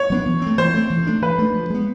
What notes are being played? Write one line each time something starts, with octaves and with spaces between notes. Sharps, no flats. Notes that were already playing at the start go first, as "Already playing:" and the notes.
Already playing: C#5
F#3 B3 D4
E3
A3 C4
E3 C5
A3 C4
E3
A3 D4
E3 B4
A3 D4
F3
G#3 B3